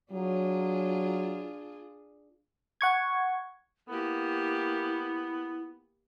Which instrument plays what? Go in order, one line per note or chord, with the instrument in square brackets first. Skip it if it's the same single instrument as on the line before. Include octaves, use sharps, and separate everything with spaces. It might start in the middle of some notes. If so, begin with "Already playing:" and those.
[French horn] F#3 [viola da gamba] D4 F4 G#4
[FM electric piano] F#5 C#6 G#6
[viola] A#3 G4 [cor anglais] B3 [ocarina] E4